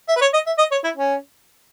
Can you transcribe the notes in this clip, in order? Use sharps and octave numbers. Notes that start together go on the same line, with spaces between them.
E5
B4
C#5
D#5
E5
D#5
C#5
E4
C#4